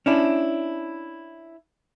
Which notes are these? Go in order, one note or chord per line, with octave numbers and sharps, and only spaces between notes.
C#4 D4 E4